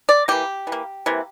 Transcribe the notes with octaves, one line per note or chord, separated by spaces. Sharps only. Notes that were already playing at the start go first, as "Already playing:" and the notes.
D5
E3 A#3 G4
E3
A#3
C3 E3 A#3